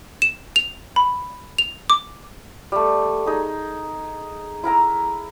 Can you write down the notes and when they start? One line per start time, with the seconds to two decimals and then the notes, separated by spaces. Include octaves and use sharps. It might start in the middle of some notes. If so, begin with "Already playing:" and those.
0.22 E7
0.56 F7
0.96 B5
1.58 F7
1.90 D6
2.72 G3 A3
3.26 D#4 G#4
4.64 E4 A#4 A#5 E6